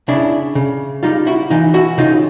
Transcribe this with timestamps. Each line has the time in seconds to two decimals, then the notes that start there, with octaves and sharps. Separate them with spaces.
0.08 C#3 D4 E4
0.55 C#3
1.03 G3 D#4 F4
1.27 E4 F#4
1.50 E3 D#4 F4
1.74 E4 F#4
1.98 C#3 D#4 F4